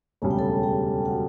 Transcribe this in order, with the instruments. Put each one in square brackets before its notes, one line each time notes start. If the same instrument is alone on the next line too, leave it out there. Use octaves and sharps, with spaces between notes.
[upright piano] E1 D2 C#3 G3 [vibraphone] A5
[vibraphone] G5
A4 A5
G4 G5
F#4 F#5